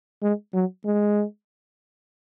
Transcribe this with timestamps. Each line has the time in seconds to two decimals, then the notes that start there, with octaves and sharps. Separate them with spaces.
0.22 G#3
0.54 F#3
0.85 G#3